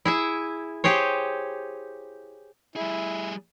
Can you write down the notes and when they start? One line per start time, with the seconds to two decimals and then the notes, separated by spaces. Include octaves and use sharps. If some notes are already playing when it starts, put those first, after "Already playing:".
0.05 E4 G#4 E5
0.84 G4 G#4 C5 C#5
2.76 G3 E4 G#4